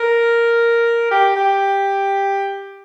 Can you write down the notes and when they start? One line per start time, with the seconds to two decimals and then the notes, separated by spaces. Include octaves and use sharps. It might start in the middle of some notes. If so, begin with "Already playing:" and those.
Already playing: A#4
1.11 G4
1.37 G4